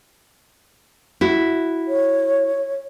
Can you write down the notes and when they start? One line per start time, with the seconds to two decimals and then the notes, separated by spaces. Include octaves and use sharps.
1.21 E4 F#4
1.88 C#5